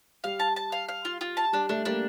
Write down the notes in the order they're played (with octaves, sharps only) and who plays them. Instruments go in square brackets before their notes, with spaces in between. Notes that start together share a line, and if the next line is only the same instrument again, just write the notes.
[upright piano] G3 [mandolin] F5
[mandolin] A5
A5
F5
F5
F4
F4
A5
[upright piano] G3 [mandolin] D4
[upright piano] A3 [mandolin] D4
[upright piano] G3 A#3 [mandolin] D4